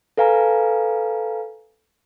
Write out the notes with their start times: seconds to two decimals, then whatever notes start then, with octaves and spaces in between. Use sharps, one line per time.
0.17 A4 B4 F5 G#5 A#5